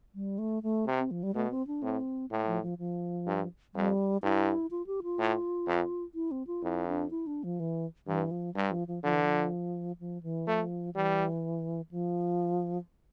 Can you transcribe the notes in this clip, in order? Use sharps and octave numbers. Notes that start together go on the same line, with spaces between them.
G3
A3
A3
C3
C4
F3
G3
B2 A3
C4
D4
A2 C4
A2 A3
F3
F3
F3
G2
F2 G3
G2 E4
F4
G4
F4
A2
F2
E4
C4
F4
F2 E4
D4
E4
D4
F3
E3
G2 E3
F3
G2 G3
F3
F3
D3 F3
E3
F3
F3
E3
F3 A3
E3 G3
F3